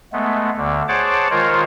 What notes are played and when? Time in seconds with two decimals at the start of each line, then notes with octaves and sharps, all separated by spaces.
0.13 G#3 A3 B3
0.57 D2 D3
0.88 G#4 C5 C#5 F#5 A5 D6
1.30 D#3 G#3 F4 A#4 C5 C#5